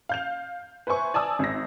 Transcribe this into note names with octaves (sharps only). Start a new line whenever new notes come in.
F5 G6 F7
B4 C5 E5 G#5 C#6
D5 G#5 A5 D#6 E6
G#1 A#6